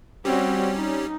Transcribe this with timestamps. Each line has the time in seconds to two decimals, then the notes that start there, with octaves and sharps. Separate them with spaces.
0.25 G3 C4 C#4 F#4
0.75 D#4